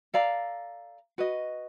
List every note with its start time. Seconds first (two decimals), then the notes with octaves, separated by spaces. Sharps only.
0.14 A4 D5 F5 A#5
1.18 F#4 B4 D#5